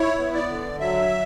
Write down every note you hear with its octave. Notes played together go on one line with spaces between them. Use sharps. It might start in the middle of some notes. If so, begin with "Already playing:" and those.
Already playing: E4 C#5
B3
D5
D3
F#3 E5